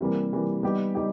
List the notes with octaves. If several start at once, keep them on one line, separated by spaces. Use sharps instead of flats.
C3 E3 G3 A#3
C3 E3 G3 A#3
G3 B3 D#4 G4
G3 D#4 G4